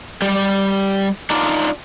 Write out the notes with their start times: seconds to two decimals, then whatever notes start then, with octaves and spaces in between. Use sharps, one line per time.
0.22 G3 G4
1.30 D4 D#4 F4 D5